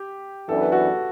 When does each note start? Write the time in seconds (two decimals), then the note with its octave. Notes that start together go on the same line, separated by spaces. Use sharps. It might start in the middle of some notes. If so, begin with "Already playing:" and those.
Already playing: G4
0.49 F#2 E3 B3 D4 A4
0.61 B4
0.71 F#4 A4